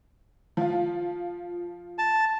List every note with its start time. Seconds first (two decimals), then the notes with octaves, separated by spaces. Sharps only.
0.57 F3 F4
1.98 A5